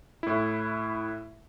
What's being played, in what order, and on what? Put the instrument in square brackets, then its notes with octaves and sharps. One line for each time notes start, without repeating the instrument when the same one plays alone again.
[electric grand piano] A2 E4